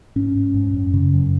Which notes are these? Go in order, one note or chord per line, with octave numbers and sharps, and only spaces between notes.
G#2 C#4
G#2
G#2
F#2
C#3
F#2